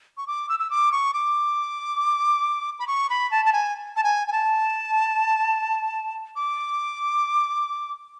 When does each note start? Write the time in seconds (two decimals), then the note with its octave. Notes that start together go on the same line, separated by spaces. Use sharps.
0.17 C#6
0.27 D6
0.49 E6
0.59 E6
0.70 D6
0.92 C#6
1.14 D6
2.79 B5
2.87 C#6
3.10 B5
3.31 A5
3.45 A5
3.53 G#5
3.96 A5
4.04 G#5
4.28 G#5
4.32 A5
6.36 D6